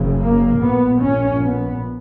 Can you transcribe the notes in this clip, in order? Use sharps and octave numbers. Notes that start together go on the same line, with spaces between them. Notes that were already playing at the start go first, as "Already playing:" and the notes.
Already playing: F#1 F#2 C#3
A#3
A#1 A#2 B3
C#4
B3